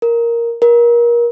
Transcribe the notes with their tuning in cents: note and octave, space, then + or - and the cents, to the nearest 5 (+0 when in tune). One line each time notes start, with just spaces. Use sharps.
A#4 +0
A#4 +25